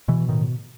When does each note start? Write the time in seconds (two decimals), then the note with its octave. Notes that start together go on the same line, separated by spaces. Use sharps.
0.08 B2 E3
0.29 A2 D#3